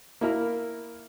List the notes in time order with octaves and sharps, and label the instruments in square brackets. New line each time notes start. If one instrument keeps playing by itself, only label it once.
[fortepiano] A#3 E4 A#4